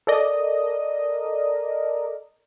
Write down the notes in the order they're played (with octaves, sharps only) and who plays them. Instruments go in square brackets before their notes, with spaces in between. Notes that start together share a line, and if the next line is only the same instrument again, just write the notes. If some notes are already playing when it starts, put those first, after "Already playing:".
[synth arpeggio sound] A4 A#4 D5 D#5